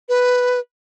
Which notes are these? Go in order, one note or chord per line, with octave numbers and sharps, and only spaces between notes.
B4